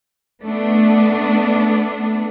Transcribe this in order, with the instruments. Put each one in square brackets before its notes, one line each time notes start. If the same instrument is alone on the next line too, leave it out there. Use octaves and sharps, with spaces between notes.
[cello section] A3 B3 D4